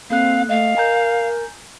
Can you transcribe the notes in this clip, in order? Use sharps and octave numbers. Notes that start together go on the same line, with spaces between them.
A#3 C4 A4 F5 F#6
A3 D#5 F5
A#4 G#5 A#5 G6